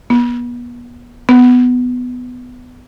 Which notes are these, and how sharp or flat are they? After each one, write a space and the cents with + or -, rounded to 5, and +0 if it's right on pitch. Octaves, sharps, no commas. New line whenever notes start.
B3 -35
B3 +10